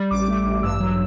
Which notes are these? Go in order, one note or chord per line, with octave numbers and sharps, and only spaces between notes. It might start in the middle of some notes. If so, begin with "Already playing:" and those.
Already playing: G3
A1 D6
A3
A1
G2 E6
F#3